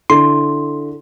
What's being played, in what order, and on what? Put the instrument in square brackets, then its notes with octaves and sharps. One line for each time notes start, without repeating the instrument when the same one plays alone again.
[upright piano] D3 E4 [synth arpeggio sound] C6